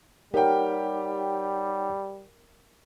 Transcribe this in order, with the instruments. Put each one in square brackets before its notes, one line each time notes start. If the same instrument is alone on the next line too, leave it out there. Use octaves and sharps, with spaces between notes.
[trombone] G3 [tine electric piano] D#4 C#5 F#5 [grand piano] G4 G5 [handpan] A#4